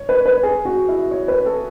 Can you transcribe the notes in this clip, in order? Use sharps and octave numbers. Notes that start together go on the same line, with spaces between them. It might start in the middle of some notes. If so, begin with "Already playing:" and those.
Already playing: C#5
B4
B4
G#4
F#4
E4
C#5
B4
A4